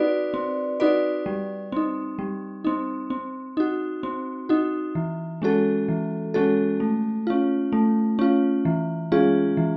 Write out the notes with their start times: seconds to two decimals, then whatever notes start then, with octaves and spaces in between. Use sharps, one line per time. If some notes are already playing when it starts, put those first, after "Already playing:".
Already playing: C4 D#4 F#4 B4 D5
0.34 C4
0.80 D#4 F#4 B4 D5
1.26 G3
1.72 C4 D#4
2.19 G3
2.64 C4 D#4
3.10 C4
3.57 D#4 F#4
4.03 C4
4.49 D#4 F#4
4.95 E3
5.42 G#3 C#4 F#4 A4
5.88 E3
6.34 G#3 C#4 F#4 A4
6.80 A3
7.27 C#4 F4
7.72 A3
8.19 C#4 F4
8.65 E3
9.12 G#3 C#4 F4 G#4
9.57 E3